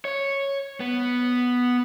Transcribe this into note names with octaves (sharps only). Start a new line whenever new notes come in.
C#5
B3